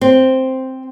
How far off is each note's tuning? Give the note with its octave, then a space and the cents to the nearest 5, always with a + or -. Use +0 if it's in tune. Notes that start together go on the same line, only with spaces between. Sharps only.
C4 +0